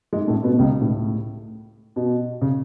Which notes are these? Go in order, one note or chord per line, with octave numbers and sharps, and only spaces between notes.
G#2 G#3
A2 A3
B2 B3
C#2 C#3
A2
B2
C#3